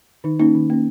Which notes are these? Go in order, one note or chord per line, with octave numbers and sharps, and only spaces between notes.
D#3 D#4
A#3 C#4 D#4
D#3
A#3 C#4